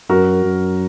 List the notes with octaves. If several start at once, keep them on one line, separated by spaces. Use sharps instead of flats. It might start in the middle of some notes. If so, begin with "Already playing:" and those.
F#2 F#4 A#4
F#2